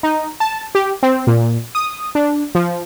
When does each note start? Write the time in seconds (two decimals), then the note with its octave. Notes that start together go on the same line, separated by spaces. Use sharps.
0.03 D#4
0.40 A5
0.75 G4
1.03 C4
1.27 A#2
1.75 D#6
2.15 D4
2.55 F3